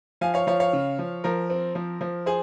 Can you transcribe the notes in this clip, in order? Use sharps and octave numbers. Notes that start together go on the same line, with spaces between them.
F3 F5 G#5
C#5 F5
F3 C#5 F5
C#5 F5
C#3
F3
F3 A#4
C4
F3
F3
G#4 C5